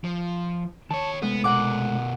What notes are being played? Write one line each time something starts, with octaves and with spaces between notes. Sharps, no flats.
F3
D#3 C#5 A5
C3 G#3 A3 B3
B2 A#4 F#5 D6